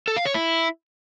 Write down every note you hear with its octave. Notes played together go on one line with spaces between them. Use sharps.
A4
F5
C#5
E4